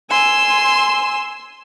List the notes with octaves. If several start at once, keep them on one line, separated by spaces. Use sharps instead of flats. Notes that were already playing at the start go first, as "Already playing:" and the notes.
G#5 C6 E6